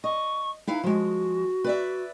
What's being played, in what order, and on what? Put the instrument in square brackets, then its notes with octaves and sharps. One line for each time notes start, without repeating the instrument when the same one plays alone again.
[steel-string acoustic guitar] D#5 [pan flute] C#6
[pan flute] D#4 [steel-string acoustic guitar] E4 B4 F5
[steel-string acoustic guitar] F3 G#3 [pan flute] F#4
[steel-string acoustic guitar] B4 D5 E5